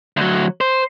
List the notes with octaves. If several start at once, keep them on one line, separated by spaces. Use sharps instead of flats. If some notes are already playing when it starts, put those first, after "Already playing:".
D2 F#3
C5